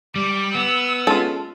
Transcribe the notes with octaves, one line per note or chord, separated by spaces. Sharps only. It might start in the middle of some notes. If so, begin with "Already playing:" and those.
G3 D6
B3 E6
G#3 C#4 F4 A4